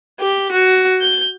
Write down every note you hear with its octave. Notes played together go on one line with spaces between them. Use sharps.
G4
F#4
G6